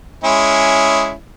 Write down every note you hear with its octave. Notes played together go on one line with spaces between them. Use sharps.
G#3 C#4 E4